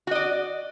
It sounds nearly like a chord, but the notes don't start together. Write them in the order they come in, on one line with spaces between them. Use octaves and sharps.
F#4 D#5 D5